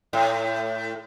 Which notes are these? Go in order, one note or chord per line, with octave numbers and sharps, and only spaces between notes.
A2